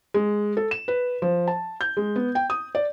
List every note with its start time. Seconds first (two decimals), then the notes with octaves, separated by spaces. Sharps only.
0.14 G#3
0.57 A4
0.71 E7
0.88 B4
1.22 F3
1.48 A5
1.81 G6
1.97 G#3
2.16 B3
2.35 G5
2.50 D#6
2.75 D5